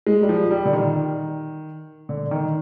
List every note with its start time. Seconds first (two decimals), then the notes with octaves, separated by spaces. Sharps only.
0.07 G#3
0.23 G3
0.29 F3
0.51 G3
0.66 D3
0.73 D#3
2.09 D3
2.31 D#3